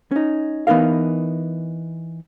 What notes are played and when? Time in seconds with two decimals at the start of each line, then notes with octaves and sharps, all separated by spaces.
0.11 C#4 D#4
0.67 E3 B3 D#4 A#4 F5